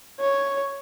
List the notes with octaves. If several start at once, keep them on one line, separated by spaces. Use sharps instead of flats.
C#5